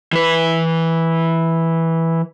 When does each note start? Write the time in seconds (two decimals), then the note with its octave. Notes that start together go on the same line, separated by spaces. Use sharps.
0.13 E3 B4